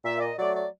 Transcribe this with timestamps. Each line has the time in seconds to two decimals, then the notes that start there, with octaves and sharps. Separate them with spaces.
0.05 A#2 E5
0.17 D5
0.22 D#5
0.39 F#3 A3 D5
0.56 D5